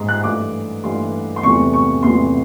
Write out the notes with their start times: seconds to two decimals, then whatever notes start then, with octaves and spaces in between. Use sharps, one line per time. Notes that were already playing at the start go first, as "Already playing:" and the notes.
Already playing: G#2 C6
0.09 F#6
0.24 G2 E3 A3 D6
0.83 G2 E3 A3 C6
1.36 C6
1.43 E2 C3 E3 A3 C#6
1.73 C#6
2.03 E2 C3 E3 A3 C6